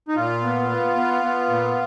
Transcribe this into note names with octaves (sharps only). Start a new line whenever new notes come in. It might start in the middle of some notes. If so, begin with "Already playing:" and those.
D#4
A#2 F4
B3
B3
B3
B3
A#2